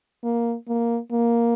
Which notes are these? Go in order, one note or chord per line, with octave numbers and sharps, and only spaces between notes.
A#3
A#3
A#3